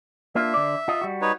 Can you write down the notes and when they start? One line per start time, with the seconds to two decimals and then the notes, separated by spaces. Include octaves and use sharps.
0.35 A#3 D4 F4 E5
0.54 D3 D5
0.88 F4 D#5
1.01 G3 F#4
1.22 D#4 B4 C#5